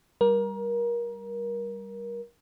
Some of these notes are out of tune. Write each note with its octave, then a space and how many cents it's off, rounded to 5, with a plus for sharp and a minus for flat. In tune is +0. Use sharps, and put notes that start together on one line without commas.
G3 +0 A#4 +25